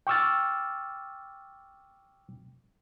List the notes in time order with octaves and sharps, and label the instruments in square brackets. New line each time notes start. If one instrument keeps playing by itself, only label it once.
[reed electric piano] G5 C#6 D6 E6 F6 A6